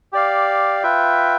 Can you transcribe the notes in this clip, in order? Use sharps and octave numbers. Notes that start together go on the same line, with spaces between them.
G4 D5 F5
F4 B4 E5 G5